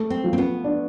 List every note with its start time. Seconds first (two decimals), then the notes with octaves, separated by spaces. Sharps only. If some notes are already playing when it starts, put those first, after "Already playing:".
Already playing: A3
0.10 C4
0.24 F3
0.33 C4
0.38 B3
0.64 D4